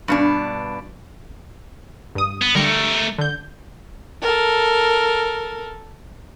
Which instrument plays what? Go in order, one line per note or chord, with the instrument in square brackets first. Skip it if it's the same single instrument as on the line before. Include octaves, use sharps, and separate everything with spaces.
[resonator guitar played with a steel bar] G2 B2 D4
[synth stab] G2 D#6
[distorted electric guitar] B3
[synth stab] D3 G3 C#7 [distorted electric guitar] A3 A#4
[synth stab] D3 G6
[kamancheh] A4 A#4